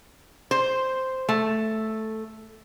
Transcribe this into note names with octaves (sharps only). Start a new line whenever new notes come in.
C5
A3